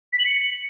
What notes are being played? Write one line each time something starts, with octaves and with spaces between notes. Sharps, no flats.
B6
F#7
C#7